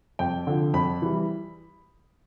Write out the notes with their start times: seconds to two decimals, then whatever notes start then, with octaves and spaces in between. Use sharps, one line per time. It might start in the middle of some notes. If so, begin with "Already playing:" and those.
0.19 F2 G5
0.47 D3 F3
0.74 F2 B5
1.02 E3 G3